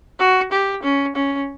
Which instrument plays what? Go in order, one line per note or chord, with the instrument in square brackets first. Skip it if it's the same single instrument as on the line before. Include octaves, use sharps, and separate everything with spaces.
[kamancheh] F#4
G4
C#4
C#4